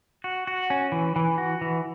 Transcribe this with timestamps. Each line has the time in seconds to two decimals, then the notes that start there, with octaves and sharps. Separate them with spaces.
0.24 F#4
0.47 F#4
0.70 C#4
0.92 E3
1.16 E3
1.38 F#4
1.61 E3